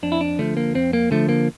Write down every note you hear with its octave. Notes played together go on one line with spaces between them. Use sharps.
F2 D4
E4
D4
D3 F3 A3
A#3
F2 C4
A#3
D3 F3 A3
A#3